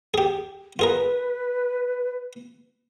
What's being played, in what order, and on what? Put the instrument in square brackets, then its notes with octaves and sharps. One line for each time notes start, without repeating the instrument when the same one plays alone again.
[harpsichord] G4 G#4
[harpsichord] F4 G#4 A#4 [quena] B4